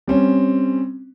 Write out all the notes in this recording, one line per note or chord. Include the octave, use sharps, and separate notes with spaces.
G3 C4 C#4